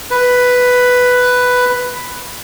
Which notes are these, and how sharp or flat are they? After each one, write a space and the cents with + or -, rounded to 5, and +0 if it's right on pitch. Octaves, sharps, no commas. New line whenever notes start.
B4 +5